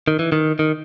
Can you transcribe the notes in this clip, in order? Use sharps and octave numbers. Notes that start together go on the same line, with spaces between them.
D#3
E3
D#3
D#3